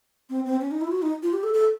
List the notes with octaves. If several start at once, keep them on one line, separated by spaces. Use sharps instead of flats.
C4
C4
C#4
D#4
E4
F4
F#4
D#4
F4
G4
A4
A4